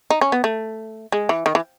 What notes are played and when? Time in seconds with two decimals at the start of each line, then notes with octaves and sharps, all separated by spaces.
0.10 D#4
0.21 C#4
0.32 B3
0.44 A3
1.12 G#3
1.29 E3
1.46 D#3
1.55 E3